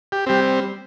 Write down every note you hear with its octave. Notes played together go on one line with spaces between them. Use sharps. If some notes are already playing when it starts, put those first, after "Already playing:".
G4
G3 C4 G4